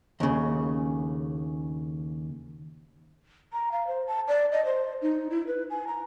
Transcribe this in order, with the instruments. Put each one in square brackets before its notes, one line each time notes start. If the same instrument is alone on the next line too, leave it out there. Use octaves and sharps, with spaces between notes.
[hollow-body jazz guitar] D#2 C#3
[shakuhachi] A#5
F5
C5
A5
D5
D#5
C5
D#4
E4
B4
G#5
A#5